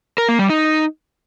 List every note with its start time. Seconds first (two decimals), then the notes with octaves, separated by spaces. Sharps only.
0.18 A#4
0.29 A#3
0.39 G3
0.50 D#4